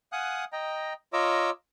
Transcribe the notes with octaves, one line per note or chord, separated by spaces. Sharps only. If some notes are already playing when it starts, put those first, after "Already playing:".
F5 F#5 G#5 D#6 F#6
D#5 G5 A#5
F4 C#5 D#5 A#5 D6 E6